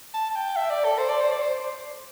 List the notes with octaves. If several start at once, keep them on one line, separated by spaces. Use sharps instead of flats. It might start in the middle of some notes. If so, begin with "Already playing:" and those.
A5
A5
G5
E5
D5
A4
C5
D5
C5
D5
C5